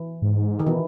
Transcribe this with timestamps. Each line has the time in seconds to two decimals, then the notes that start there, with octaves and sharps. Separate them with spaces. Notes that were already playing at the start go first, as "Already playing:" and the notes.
Already playing: E3
0.22 G#2
0.59 D#3
0.66 B2 E3